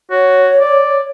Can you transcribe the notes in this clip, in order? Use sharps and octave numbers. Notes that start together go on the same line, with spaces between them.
F#4 C#5
D5